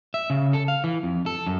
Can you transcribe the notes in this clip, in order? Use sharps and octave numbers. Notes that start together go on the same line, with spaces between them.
E5
C#3
A4
F5
E3
F2
A4
F#2